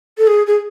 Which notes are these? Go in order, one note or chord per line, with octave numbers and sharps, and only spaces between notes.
A4
G#4
G#4